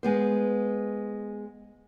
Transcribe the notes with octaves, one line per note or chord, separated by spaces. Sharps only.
G#3 B3 C5